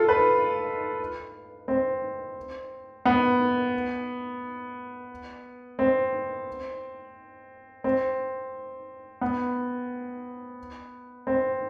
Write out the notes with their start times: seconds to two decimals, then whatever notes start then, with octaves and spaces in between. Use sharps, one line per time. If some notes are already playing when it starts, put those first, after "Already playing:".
Already playing: F4 A4
0.09 B4
1.68 C4
3.06 B3
5.79 C4
7.84 C4
9.21 B3
11.27 C4